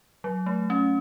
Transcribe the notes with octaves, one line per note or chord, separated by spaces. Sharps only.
F#3
A3
C#4